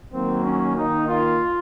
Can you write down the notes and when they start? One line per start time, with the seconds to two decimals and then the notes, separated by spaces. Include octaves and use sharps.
0.12 D#3 F#3 A#3 C4
0.44 C#4
0.75 D#3 A#3 D#4
1.07 F4